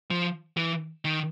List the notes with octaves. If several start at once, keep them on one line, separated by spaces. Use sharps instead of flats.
F3
E3
D#3